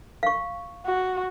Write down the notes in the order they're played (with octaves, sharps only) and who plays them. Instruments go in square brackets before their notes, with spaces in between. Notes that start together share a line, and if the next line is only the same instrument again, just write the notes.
[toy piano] F5 C#6
[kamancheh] F#4